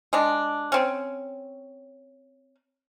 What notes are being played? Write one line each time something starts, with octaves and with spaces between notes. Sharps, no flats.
G#3 D4
C4 C#4